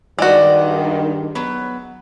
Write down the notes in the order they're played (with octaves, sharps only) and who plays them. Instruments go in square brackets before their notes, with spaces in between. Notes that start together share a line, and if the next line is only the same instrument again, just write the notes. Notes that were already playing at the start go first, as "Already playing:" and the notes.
[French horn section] G2 D#3 [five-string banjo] G#3 F#4 [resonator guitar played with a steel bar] D5
[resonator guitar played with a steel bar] F#3 B3